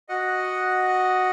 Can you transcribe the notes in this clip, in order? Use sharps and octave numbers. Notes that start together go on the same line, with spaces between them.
F#4 D#5 F#5